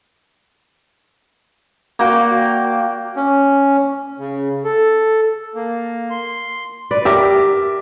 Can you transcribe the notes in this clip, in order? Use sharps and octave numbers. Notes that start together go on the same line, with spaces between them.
A#3 F#4 D5 G5
C#4
C#3
A4
A#3
C6
B4 D5
G4 A#4 E5 D6